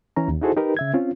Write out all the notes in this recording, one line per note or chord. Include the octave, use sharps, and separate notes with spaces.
E3 C#4 A#5
D#2
D#4 E4 F#4 G#4 A4 C5
D#4 G4 A#4 B4
C#3 E5 G#6
C4 C#4 F4